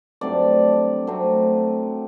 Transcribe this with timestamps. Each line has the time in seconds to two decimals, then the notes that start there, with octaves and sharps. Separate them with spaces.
0.21 G2 F#3 A3 C4 D5
1.07 F#3 A3 C4